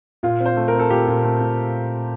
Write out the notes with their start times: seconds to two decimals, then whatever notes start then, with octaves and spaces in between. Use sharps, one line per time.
0.23 A#2 F4
0.40 C4
0.46 C5
0.57 A3
0.68 A#4
0.74 C4
0.79 A4
0.90 A#2 G4
1.07 A#2
1.24 A3
1.40 A#2